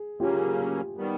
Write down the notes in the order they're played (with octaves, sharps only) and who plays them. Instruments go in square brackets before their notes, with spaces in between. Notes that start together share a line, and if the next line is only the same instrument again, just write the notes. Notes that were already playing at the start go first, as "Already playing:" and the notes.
Already playing: [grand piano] G#4
[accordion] C#3 F#3 A#3 C#4 [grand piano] F4 G4
[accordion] D#3 G3 B3